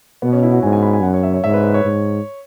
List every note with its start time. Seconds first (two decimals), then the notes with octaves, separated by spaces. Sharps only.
0.22 B2 B3
0.33 C#4
0.43 E4
0.53 F#4
0.63 G#2 G#5
0.73 G#5
0.83 B5
0.93 G#5
1.03 F#2 F#5
1.14 C#5
1.23 E5
1.33 C#5
1.44 G#2 E5
1.54 B4
1.64 B4
1.74 C#5
1.84 G#2